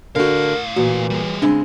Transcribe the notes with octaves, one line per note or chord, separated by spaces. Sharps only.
A2 D3 F#4 A#4 F5
A#2 E3 A#3 F#4
G3 G#4
C#3 G#3 C4 D4